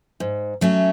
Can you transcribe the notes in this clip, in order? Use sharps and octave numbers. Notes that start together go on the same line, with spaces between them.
G#2
F#3 A3 C#4